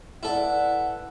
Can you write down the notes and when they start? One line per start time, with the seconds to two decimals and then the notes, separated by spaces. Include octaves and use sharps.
0.23 E4 A4 B4 D5 F#5